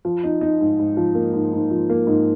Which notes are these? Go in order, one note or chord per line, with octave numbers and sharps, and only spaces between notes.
F3
D#4
D#4
G#2
G#2
F3
A#3
G#2
G#2
F3
A#3
G#2